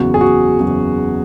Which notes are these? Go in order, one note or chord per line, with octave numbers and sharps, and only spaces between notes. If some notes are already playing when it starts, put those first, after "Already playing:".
Already playing: F#1 E2 C#3 F#3 F#4
G#4
F#4
F#1 E2 C#3 F#3